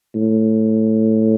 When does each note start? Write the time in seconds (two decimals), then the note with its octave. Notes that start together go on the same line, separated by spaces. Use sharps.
0.15 A2